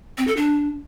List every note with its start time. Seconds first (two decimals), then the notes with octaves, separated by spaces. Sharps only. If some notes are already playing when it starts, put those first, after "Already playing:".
0.18 C4
0.27 A4
0.37 D4